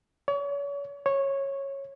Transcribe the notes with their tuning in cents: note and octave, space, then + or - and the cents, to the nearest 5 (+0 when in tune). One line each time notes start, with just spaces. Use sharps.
C#5 +40
C#5 -10